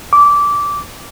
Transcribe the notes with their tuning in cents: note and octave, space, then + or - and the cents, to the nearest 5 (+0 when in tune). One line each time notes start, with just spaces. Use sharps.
D6 -15